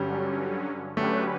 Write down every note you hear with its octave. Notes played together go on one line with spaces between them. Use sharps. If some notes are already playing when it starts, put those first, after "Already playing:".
Already playing: G2 D3 F#3 G3 C#4
D3 F#3 A3 C#4 G4 B4